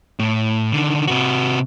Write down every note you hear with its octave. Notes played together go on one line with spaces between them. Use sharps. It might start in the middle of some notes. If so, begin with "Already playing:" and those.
A2
D3 D#3
C3 F#4